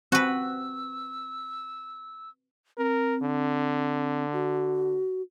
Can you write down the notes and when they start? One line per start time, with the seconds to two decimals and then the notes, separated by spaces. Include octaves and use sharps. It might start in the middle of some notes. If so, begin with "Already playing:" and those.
0.12 C4 F#4 B4 E6
2.78 C4 A#4
3.23 D3
4.33 F#4